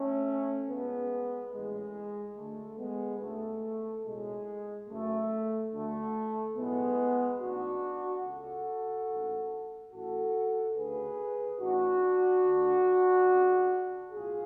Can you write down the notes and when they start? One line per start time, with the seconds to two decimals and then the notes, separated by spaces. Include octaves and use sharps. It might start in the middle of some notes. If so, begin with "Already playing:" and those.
Already playing: A3 C#4
0.68 C#2 C#3 G#3 B3
1.52 A1 A2 G#3
2.36 D2 D3 A3
2.78 G#3 B3
3.20 D2 C#3 A3
4.04 B1 A2 G#3
4.88 F#1 F#2 C#3 A3
5.72 D2 D3 A3
6.56 B1 A2 G#3 B3
7.40 A1 G#2 D4 F#4
8.24 C#2 C#3 F#4 A4
9.08 A1 G#2
9.92 A1 A2 F#4 A4
10.76 D2 C#3 G#4 B4
11.60 A1 A2 D4 F#4
12.44 D2 D3
13.28 C#2 C#3
14.12 B1 A2 F4 G#4